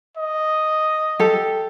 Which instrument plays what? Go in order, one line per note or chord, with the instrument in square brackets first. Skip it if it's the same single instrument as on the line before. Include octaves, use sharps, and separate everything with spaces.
[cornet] D#5
[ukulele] G4 A4